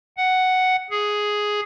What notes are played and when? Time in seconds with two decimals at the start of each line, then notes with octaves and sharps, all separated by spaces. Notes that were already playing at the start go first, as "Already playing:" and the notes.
0.17 F#5
0.90 G#4